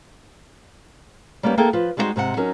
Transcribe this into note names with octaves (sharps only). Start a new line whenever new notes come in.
G3 A#3 B3 C#4 G4
A#3 E4 G#4 A4 G5
F3 F4 B4
G3 G#3 D#4 E4 F#4 C5
G#2 C3 G4 F#5
F#3 C#4 D#4 A#4